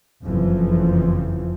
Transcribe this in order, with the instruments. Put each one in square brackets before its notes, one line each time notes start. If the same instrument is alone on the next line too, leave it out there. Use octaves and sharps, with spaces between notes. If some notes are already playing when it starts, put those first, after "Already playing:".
[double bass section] F#1 F2 E3 F3